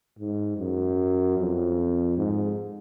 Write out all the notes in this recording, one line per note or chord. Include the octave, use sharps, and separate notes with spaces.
G#2
F#2
F2
G#2